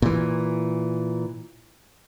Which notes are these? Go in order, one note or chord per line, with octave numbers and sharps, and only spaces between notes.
A#2 E3